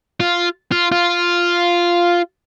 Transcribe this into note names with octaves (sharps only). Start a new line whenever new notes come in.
F4
F4
F4